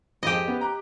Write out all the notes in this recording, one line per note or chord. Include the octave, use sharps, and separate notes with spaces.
G#1 F2 G4 G#4 D#5
B3 C#4 B4
A#5 F#6